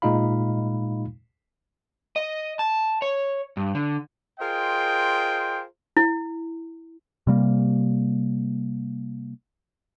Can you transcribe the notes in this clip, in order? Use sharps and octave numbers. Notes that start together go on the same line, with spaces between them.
A#2 G#3 D#4 F4 F5 B5
D#5
A5
C#5
G2
D3
F4 G#4 A#4 C5 D#5 G5
E4
C3 G3 A#3